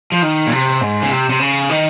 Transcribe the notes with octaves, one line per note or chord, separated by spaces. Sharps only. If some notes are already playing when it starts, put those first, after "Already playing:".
F3
D#3
A#2
C3
G#2
C#3
C3
C3
C#3
D#3